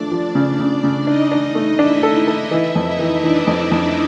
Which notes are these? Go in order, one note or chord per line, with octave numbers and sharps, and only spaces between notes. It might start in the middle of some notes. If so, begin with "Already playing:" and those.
Already playing: F3 A3 D4 D5
F3
C#3
C#3
C#3
D4 D#4 D#5
D4
A3
D4 E4 E5
A4
E4 E5
A4
E3 E4 E5
F2
D#4 D#5
E3
E3 D4 D5
F2
F2